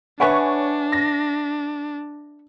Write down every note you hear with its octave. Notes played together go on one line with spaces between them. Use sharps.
D4 B4 C#5 E5 F#5 G#5 C#6
A#6